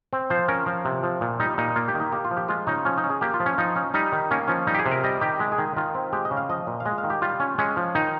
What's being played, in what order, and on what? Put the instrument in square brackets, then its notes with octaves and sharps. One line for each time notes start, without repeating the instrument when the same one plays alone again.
[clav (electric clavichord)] C4
F3 C5
C#4 A#4
F3
C3
F3
A#2
G3 D#4
A#2 D#4
A#3 F4
G4
D#3
D#4
A#3 G4
F4
F3
G4
G#3 F4
C#3 D#4
F3 C#4
D#4
C#4
G#4
A#3 G4
F4
F3
C#4
F3 D#4
C#4
G3 D#4
D#3
A#3 C#4
F3 C#4
G3 D#4
G4
G#4
C3
A#4
G3 D#5
D#3 G4
G#3
G#4
D#3
D#3 F4
C4
G#3 G4
D#5
C#3
F5
F3 D#5
A#2
F5
G#3 D#5
F5
D#3
G4
G3 F4
C#4
G#3 C#4
F3
D#3 D#4